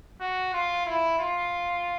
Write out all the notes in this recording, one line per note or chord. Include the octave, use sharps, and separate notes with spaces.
F#4
F4
E4
F4